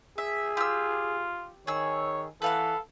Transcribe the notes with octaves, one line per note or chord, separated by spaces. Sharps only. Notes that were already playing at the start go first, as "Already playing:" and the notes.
G#4 E5
F4 G4 E6
D#3 G#4 C#5 E6
E3 A4 B4 F5 F#5